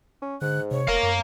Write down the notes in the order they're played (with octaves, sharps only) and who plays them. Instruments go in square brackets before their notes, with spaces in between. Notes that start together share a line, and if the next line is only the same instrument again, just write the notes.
[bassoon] C#4
[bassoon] G#2 [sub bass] D3 [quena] F#6
[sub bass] C3 [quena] C#5
[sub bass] F1 [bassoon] A#4 [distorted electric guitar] F5 A#5
[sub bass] F#2